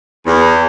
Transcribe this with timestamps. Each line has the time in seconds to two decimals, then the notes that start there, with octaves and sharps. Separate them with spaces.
0.26 E2